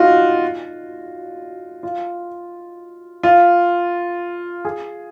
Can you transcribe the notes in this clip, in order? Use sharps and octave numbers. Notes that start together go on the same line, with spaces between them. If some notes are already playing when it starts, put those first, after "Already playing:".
Already playing: D#4 F4 F#4
F4
F4
G#4